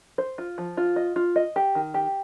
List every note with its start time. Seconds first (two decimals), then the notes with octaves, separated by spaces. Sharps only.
0.18 C5
0.38 F4
0.58 F3
0.77 F4
0.96 D#5
1.16 F4
1.36 D#5
1.56 G4
1.75 D#3
1.94 G4